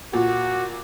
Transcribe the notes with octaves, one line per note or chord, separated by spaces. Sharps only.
A#2 F#4